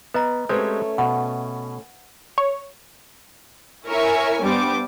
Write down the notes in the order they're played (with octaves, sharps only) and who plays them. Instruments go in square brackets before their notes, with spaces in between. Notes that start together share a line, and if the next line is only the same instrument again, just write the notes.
[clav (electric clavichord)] B3 [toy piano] B4 D#5 A#5
[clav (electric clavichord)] G#3 C4 G4 [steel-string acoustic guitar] A3 C#4 [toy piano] B4 C5
[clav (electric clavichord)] B2 [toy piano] F#5
[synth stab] C#5
[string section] E4 A#4 C#5 E5 G#5 C#6
G2 G3 B3 C5 D6